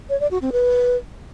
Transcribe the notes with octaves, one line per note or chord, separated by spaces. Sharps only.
C#5
D5
F#4
C4
B4